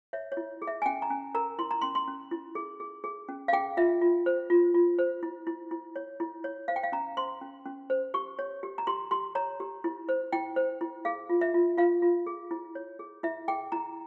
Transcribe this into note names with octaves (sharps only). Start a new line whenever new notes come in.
C#5 E5
C#5
E4
G#4
E5
G#5
C#4 G5
A#5
C#4 G#5
A#4 A#5
E4 C6
A#5
C#4 C6
C6
C#4
E4
G#4
G#4
G#4
C#4
F5
G#4 G5
F4 E5
F4
C5
F4
F4
C5
E4
E4
E4
C#5
E4
C#5
C5 F5
G5
F5
C#4 A#5
C5 C6
C#4
C#4
C5
G4 C#6
C#5
G4
A#5
G4 C6
G4 C6
C#5 A#5
G4
E4
C5
E4 G5
C5
E4
G#4 F5
F4
E5
F4
F4 F5
F4
G#4
E4
C#5
G#4
E4 E5
G#4 G5
E4 A#5